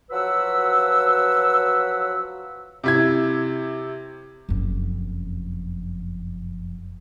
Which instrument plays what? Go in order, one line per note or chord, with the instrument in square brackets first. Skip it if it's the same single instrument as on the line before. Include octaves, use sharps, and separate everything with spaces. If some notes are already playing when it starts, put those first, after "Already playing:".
[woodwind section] F3 F#3 F#4 B4 F#5 E6
[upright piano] C3 E4 G#6
[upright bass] F#1 F2